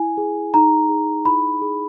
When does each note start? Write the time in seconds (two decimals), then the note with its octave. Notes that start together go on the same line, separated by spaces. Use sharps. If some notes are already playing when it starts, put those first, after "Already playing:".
Already playing: E4 G#5
0.17 G#4
0.54 D#4 A#5
0.89 G#4
1.25 E4 B5
1.61 G#4